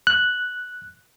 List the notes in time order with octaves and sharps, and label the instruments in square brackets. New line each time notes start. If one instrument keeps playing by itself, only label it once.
[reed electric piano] F#6